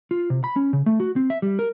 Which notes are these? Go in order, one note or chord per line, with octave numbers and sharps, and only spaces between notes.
F4
C3
B5
C#4
C#3
A3
F#4
C4
E5
G3
A#4